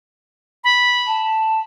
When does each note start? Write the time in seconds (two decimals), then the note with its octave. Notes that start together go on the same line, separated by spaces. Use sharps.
0.64 B5
1.07 A5